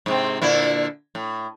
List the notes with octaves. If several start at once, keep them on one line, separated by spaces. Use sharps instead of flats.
G#2 C3 C4
A#2 D3 E4
A2